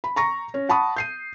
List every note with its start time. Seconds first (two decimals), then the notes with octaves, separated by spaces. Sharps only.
0.04 B5
0.16 A#5 C#6 A#6
0.54 C#4
0.69 F#5 A5 B5 C#6 D#6
0.96 G6 C7 D#7